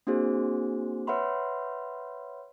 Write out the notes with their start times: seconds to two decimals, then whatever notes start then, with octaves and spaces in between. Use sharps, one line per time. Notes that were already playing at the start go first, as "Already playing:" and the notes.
0.07 A#3 C4 D4 F#4 G#4 C5
1.07 B4 C#5 E5 F#5 B5 C6